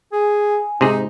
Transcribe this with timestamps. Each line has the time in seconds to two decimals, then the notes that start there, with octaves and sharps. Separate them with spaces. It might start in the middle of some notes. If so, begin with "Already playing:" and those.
0.12 G#4 G#5
0.81 G#2 C3 D#4 G#4